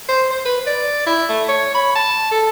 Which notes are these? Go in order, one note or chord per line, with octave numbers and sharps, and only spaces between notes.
C5
C5
B4
D5
E4
A3
C#5
B5
A5
A4